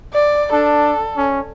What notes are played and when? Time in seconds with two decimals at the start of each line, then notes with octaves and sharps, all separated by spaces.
0.13 D5
0.52 D4 A4
1.17 C#4